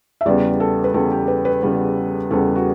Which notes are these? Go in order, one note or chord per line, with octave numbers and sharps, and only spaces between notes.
E5
E2 C#3 G3 B3 D5
A4
B4
E2 C#3 G3 B3 A4
G4
B4
B4
E2 C#3 G3 B3
E2 C#3 G3 B3 A4
F#4